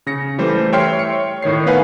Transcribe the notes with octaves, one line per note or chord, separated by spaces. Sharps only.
C#3 A#6 C#7
E3 G3 A3 C5
C#5 E5 G5 C6 F6 C7
C#5 C#7
A2 D#3 C#5 C7
B3 D#4 B4 F5 F#5 G#5